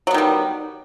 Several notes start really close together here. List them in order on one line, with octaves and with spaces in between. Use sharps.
F#3 B3 D#3 G3